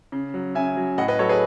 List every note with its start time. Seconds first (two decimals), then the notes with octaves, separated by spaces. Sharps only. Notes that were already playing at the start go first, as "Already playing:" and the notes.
0.12 C#3
0.34 F#3
0.55 C#3 E5 G#5
0.77 F#3
0.98 A2 D#5 F#5
1.08 B4 D#5
1.19 F#3 A4 C#5
1.29 G#4 B4